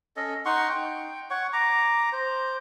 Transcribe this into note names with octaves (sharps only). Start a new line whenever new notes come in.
C#4 A4 D#5
D#4 F#5 C6 C#6
G5
C#5 F#5 C#6
A#5 D6
C5